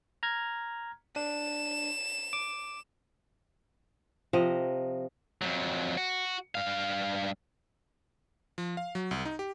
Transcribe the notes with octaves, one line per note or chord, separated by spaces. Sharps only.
A#5 F6 G#6
D4 E7
D6
C3 F3 D#5
F2 F#3
F#4
G2 F5
F3
F5
F#3
C2
D#4
G4